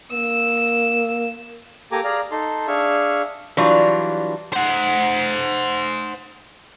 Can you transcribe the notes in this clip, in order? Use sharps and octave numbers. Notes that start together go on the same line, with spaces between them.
A#3 E6
A#3 G4 A4 G#5 A#5 D6
G#4 D5 F5 A#5
D#4 A4 A5 C6
D4 G#4 E5 F5 C#6
E3 F#3 G3 D4 F4
C5 F#5